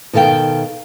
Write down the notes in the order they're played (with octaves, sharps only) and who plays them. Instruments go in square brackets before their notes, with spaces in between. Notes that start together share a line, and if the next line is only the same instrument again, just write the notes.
[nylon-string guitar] B2 D#3 A4 F5 G5